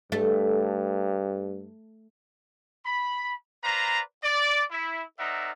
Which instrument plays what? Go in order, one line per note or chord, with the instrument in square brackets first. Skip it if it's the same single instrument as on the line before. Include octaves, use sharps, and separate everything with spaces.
[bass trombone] G2 [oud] A3
[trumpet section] B5
B4 C5 D5 F5 A#5
D5
E4
C4 D#4 A#4 D5 E5 F#5